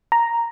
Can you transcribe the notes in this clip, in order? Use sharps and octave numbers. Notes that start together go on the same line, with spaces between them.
A#5